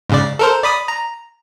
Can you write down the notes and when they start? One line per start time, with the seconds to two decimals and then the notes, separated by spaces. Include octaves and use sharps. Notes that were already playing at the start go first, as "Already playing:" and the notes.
0.09 G#2 C#3 D5
0.39 A4 A#4 C5
0.63 D5 B5 D#6
0.88 A#5